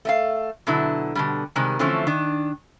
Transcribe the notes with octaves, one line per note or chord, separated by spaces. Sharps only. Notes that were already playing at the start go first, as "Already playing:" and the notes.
A3 E5 F5
B2 D3 F#3 E4
B2 D3 G3
C3 D#3 G3 G#3
D3 E3 F3 A3 C4 C#4
D#3 D4